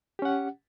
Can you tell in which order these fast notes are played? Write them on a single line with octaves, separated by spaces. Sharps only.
G4 C#4 F#5